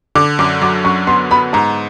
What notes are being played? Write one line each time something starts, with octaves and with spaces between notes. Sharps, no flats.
D3 D6
F#2 D6
F#3 D6
F#2 C#6
B3 C6
B3 B5
G#2 A#5